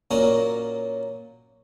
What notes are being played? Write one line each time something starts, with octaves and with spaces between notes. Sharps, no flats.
A#2 F#3 A#3 C#4 F#5 A#5